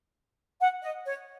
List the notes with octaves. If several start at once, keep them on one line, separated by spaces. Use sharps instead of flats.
F#5
D#5
C#5